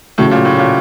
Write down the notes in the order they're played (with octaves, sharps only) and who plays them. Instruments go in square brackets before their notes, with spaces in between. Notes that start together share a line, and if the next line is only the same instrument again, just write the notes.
[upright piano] A2 [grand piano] C#3 F#3 A3
[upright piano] A#2
A2
A#2